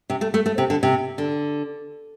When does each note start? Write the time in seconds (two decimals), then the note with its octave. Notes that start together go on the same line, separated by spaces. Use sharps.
0.10 C3
0.21 A3
0.34 A3
0.46 A3
0.58 C3
0.70 D3
0.83 C3
1.18 D3